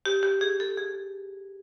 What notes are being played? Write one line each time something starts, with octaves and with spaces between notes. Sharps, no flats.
G4
G4
G#4
A4
G#4